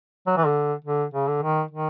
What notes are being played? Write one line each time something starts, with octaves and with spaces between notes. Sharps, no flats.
F#3
E3
D3
D3
C#3
D3
D#3
D#3